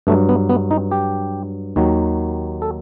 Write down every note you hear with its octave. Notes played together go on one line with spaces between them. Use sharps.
G2 F#3 A3
B3
B3
D#4
G4
D#2 D#3 F#3
A4